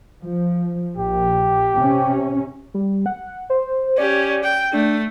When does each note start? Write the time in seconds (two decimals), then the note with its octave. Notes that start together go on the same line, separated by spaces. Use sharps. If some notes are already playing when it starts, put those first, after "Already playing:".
0.21 F3
0.97 A#1 G4
1.76 C3 C#4
2.74 G3
3.06 F#5
3.50 C5
3.98 C#4 G4 D5
4.44 G5
4.73 A3 D4